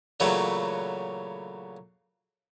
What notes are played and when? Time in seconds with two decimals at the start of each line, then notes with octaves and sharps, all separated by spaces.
0.20 A#2 C#3 E3 F#3 A3 B3